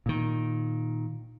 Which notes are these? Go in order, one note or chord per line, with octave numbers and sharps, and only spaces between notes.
A#2 D#3